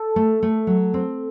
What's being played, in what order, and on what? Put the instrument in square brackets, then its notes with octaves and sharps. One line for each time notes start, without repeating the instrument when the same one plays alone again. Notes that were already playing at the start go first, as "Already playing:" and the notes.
Already playing: [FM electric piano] A4
[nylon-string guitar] A3
A3
F#3
C4